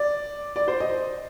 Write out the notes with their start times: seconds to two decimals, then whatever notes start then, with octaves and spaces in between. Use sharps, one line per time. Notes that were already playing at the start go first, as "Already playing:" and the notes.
Already playing: D5
0.56 D5
0.68 C5
0.80 D#5